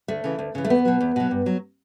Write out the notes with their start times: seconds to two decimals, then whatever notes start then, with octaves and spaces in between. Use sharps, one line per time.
0.08 D2 A3
0.24 C#3 E3
0.39 D2
0.55 C#3 E3
0.65 A3
0.70 E2 B3
0.85 B2 F#3
1.01 E2
1.16 B2 F#3
1.31 G2
1.46 F#3